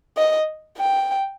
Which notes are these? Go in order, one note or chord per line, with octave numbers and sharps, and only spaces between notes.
D#5
G5